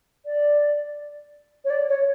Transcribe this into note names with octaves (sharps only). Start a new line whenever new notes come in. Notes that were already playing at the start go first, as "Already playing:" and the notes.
D5
C#5
D5
C#5